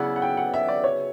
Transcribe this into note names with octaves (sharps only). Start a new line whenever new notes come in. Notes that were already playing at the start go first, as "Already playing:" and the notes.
Already playing: C#3 F#3 B3 E4 D5 F#5
F#5
G5
F#5
E5
D5
C#5